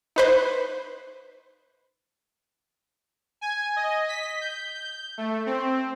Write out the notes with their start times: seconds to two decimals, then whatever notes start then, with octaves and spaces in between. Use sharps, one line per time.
0.16 D#4 B4 C5
3.41 G#5
3.76 D#5
4.08 B6
4.41 G6
4.75 G6
5.18 A3
5.46 C4